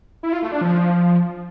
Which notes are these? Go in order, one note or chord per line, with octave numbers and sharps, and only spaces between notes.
E4
F4
A3
D4
F3